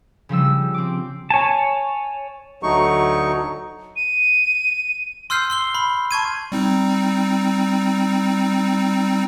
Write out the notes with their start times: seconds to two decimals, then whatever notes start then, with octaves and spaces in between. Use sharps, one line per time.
0.29 C#3 F3 G3 E6
0.74 C4 D6
1.30 C#5 G#5 A5
2.63 D2 F#3 A3 D#4 C#6
3.96 D#7
5.30 C6 E6 F6 G6 C7
5.50 C6 F6 G7
5.75 B5
6.11 A5 C#6 G#6 D#7
6.52 G3 C4 D#4